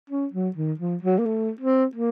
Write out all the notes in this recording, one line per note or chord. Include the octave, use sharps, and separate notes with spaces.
C#4
F#3
D#3
F3
F#3
A#3
A3
C4
A#3